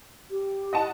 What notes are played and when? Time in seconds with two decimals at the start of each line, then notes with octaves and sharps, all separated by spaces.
0.31 G4
0.73 D#5 F#5 A5